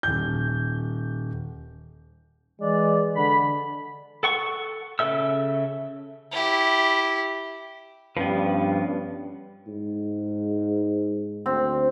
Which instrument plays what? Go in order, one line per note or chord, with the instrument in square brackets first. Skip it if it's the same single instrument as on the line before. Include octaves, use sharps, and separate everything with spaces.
[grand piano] D#1 G6
[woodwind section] E3 D5 [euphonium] G#3
[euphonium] D3 [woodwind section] B5
[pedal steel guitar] A4 F#5 C#6
C#3 A4 E5 E6
[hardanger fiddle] E4 G4
[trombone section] G2 [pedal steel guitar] F3 B3 [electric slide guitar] C#4 G4 B4
[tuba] G#2
[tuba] D2 [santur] C4